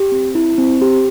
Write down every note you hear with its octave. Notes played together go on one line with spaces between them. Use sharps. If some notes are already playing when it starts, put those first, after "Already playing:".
Already playing: G4
C4
E4
C4
G4